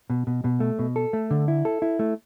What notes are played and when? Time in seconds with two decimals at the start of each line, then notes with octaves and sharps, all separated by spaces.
0.10 B2
0.27 B2
0.44 B2
0.60 A3
0.79 B2
0.96 A4
1.13 A3
1.31 D3
1.48 E4
1.65 A4
1.82 E4
1.99 A3